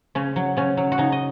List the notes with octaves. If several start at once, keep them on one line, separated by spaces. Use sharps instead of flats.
C#3 C#4
F#3
C#3 C#4
F#3
F#4
C#3 D#4
D#5